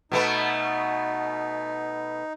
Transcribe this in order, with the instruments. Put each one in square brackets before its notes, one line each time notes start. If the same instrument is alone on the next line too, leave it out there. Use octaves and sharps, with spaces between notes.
[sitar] B2 A3 B3 [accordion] D#4